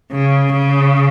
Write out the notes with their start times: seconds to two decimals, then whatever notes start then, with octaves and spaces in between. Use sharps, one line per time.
0.12 C#3
0.52 C#3